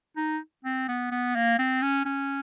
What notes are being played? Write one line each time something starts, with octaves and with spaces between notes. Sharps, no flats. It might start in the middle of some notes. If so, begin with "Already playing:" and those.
D#4
C4
B3
B3
A#3
C4
C#4
C#4